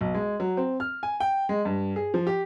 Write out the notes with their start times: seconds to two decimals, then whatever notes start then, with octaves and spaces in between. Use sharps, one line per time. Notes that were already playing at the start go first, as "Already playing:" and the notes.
0.01 B1
0.14 G#3
0.40 F#3
0.57 C4
0.80 F6
1.03 G#5
1.20 G5
1.49 G#3
1.65 G2
1.96 G#4
2.14 F3
2.27 G4